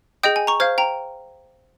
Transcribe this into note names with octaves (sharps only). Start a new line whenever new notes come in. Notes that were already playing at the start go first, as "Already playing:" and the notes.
G#4 D#5 G5 D#6 G6
G#5
A#5 C#6
C5 F5 F6 G#6
G5 A#5